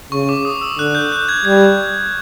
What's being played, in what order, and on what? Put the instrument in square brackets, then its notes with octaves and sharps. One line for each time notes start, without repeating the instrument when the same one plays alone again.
[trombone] C#3 [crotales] C#6
[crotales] D6
D#6
E6
[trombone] D3 [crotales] F#6
[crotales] G6
G6
G#6
[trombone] G3 [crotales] G#6